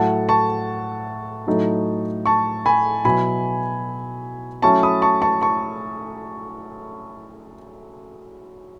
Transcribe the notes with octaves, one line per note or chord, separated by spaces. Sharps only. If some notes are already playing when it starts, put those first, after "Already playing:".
Already playing: A2 F#3 A3 F#5 A5
A5 C#6
A2 F#3 A3 D#4
A5 C#6
G#5 B5
B2 F#3 B3 E4 G#5 B5
F#3 A3 C#4 E4 A5 C#6
B5 D#6
A5 C#6
A5 C#6
A5 C#6